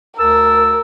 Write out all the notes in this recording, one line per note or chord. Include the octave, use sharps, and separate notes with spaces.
D2 A#4 A5 E6